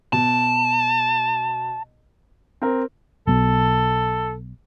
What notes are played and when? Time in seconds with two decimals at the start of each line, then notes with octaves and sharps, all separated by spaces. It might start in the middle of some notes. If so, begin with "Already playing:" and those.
0.13 B2 A5
2.62 C4 A#4
3.27 B1 B2 A4